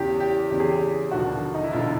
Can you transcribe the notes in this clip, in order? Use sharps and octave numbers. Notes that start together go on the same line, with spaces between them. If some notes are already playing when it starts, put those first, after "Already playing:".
Already playing: E2 C#3 E3 G4
G4
E2 C#3 E3 G4
G#4
G4
E1 D#2 D3 F3 F#4
D#4
E4
E1 D3 F3 F4